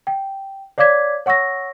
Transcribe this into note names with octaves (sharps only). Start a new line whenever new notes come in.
G5
C#5 D5 F5 D6 G#6 B6
C#5 F#5 C#6 E6 A#6